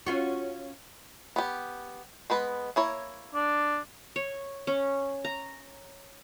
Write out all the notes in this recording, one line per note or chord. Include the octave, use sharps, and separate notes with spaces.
C#4 F4 F#4
B3 G4
G#3 B3 B4
A#3 E4 C#5
D4
C#5
C#4
A#5